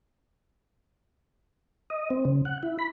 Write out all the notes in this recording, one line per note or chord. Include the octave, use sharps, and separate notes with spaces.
D#5
C4
C#3
F#5
E4
B5